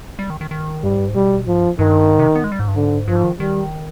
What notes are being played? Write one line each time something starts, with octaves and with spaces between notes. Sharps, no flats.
G3
D#3
D#3
D#3
G2 G3
G#2
G2
G#2
B2 G3
G#2 F3
G2
G2 D#3
G#2
C3
B3
G#3
G3
G#2
G2
G#2 D3
G2 F3
G#2
D#3
D#3 G3